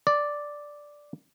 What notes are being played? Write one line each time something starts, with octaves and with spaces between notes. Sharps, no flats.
D5